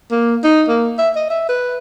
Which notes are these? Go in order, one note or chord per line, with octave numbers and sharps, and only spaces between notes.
A#3
D#4
A#3
E5
D#5
E5
B4